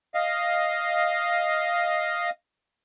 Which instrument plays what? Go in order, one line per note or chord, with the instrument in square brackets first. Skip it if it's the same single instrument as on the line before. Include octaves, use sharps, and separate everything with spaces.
[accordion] D#5 F5